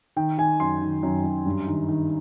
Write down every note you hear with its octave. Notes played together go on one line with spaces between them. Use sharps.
D#3 G5
D#3 G#5
F#2 C6
D#3
F#2
F#2
G2
D#3
D#3